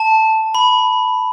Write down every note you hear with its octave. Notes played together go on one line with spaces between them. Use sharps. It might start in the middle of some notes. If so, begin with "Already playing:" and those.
Already playing: A5
B5